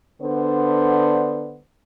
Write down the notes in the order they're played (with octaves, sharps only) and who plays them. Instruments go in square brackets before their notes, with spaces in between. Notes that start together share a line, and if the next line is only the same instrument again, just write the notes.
[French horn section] D3 B3 D4 C5